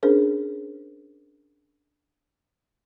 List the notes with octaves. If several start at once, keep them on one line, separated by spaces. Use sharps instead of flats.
C#4 D4 G#4 A#4 C5